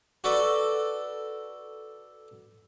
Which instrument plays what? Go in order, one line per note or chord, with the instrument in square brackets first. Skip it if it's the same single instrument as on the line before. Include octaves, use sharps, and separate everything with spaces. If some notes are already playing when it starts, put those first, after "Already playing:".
[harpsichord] F#4 A4 B4 D5